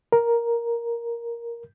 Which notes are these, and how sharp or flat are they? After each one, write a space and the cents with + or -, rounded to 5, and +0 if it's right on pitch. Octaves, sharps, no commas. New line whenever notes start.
A#4 +5